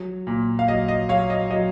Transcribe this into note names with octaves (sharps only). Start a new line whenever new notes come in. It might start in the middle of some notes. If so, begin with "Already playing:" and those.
Already playing: F#3
A#2
F5
F#3 D#5
D#5
F#3 C#5 F5
D#5
F#3 D#5